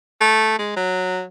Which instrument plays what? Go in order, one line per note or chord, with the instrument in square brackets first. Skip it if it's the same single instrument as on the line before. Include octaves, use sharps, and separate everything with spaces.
[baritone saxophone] A3
G#3
F#3